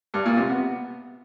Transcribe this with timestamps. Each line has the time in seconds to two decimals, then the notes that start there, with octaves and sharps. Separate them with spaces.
0.14 G2
0.26 A#2
0.37 C3
0.49 B3